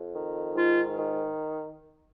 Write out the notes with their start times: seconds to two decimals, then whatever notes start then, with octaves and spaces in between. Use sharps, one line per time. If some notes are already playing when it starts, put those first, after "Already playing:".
Already playing: F2
0.14 D#3
0.55 G#2 F4
0.97 D#3